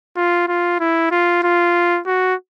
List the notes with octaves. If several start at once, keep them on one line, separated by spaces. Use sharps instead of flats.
F4
F4
E4
F4
F4
F#4